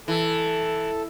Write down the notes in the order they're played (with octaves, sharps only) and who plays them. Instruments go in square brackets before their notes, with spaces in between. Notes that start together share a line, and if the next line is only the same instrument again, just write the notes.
[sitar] E3 [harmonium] A4